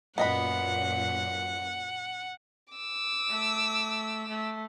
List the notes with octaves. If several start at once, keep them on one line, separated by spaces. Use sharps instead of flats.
F#2 A#2 B3 D#5 F#5 B5
D6 E6
A3
A3